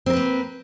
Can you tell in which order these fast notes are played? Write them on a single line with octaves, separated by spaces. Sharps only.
C4 A#4 B4 A#3